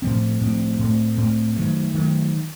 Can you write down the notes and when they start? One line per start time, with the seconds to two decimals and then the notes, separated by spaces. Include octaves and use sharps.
0.02 A2 F3 C4
0.41 A2 F3 C4
0.79 A2 A3 C4
1.17 A2 A3 C4
1.56 D#3 F#3 A3
1.94 D#3 F#3 A3